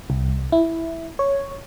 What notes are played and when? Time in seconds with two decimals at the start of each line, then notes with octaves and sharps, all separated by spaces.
0.10 C2
0.52 E4
1.19 C#5